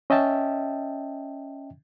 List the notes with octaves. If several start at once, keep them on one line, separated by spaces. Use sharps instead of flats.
C#4 D#5 E5 G5 A5